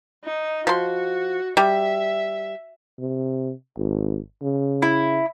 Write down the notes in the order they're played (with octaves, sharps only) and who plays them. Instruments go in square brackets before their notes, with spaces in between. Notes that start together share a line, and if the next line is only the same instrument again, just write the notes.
[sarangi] D#4
[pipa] F3 C6 [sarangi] F#4
[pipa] G3 [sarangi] E5
[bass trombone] C3
G#1
C#3
[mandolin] E4